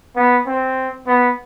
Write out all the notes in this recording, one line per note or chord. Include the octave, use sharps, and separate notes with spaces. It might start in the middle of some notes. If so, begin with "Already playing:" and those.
B3
C4
B3